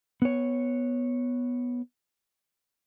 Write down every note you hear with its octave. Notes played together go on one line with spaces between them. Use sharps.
B3 C#5